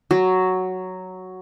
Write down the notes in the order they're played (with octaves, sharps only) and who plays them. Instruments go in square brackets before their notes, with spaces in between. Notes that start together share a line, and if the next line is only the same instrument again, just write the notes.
[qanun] F#3